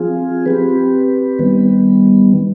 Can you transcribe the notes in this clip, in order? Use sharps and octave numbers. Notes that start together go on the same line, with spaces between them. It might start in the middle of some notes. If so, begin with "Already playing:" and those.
Already playing: F3 C4 F4 G#4
C4 G4 B4
D#3 G3 B3